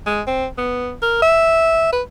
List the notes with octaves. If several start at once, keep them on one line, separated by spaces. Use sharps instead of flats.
G#3
C4
B3
A#4
E5
B4